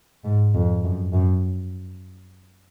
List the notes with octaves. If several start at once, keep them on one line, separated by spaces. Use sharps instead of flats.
G#2
F2
F#2
F#2